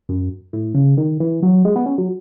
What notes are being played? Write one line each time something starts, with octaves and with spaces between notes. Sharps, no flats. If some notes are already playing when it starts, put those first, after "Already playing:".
F#2
A2
C#3
D#3
E3
F#3
G#3
B3
C#4
F#3